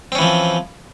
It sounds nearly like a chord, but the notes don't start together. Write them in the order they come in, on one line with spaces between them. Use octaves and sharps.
C4 C#4 E3 F3